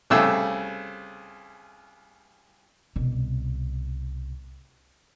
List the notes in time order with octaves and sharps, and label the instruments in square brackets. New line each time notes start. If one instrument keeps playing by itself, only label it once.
[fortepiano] C2 C#3 A3 E6
[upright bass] C2 B2